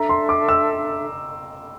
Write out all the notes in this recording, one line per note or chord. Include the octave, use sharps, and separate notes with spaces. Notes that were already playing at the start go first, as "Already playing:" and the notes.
Already playing: D4 A4 E5 A#5
C6
D6
E6